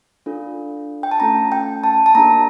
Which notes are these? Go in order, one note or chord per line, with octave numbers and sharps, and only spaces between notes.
D4 F4 A4
G5
A5
A3 C#4 F4 A4 A#5
G5
A5
A5
A#3 D4 G4 A#5